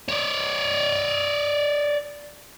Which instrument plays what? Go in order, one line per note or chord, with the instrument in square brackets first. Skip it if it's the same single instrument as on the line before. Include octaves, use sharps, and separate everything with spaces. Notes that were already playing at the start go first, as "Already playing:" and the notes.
[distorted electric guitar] C#5 D5